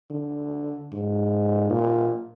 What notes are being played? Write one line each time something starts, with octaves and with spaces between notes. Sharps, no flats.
D3
G#2
A#2